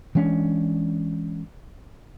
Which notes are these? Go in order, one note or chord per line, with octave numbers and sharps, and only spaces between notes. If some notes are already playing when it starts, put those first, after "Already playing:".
E3 G#3 C#4 D4